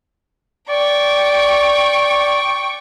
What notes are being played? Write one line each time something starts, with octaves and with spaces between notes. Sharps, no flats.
D5 G5 C#6